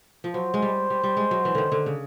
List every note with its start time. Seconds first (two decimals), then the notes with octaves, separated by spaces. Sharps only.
0.24 F3
0.34 F#3 C5
0.54 G#3
0.62 G3
0.90 G3
1.03 G3
1.17 G#3
1.31 F#3
1.45 E3
1.55 D3 D#3
1.72 D3
1.86 C#3